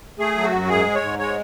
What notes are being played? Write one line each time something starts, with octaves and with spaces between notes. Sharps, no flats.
A3 G#4
F#3
F#4
F#2
G#2 G#4
G#3
C#5
G#2
G#3 C#5